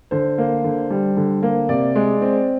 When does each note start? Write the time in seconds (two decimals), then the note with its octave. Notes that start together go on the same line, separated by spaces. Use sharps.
0.11 D3 C5
0.38 A#3
0.64 D3
0.90 G3
1.17 D3
1.43 A#3
1.69 C3 D5
1.95 G#3
2.22 C4